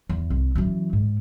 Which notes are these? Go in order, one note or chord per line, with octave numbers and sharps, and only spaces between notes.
E2
C2
F#2 E3
G#2